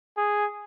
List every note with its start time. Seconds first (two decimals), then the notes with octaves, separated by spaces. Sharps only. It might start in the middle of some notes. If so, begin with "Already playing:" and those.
0.17 G#4